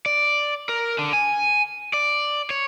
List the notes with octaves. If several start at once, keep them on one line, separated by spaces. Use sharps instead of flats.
D5
A#4
D3
G#5
D5
C#5